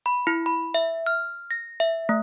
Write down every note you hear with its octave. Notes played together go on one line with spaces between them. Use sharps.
B5
E4
B5
E5
F6
A#6
E5
A3